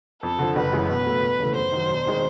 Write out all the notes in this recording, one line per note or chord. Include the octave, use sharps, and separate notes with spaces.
F2 A4
D3 F3
F#1 B4
F#2 C#3 E3 G#3
B2 B4
F#3 A3
E1
D#2 C#3 E3 A3
F#2 C5
D#3 F#3
E1
D#3 G#3 C4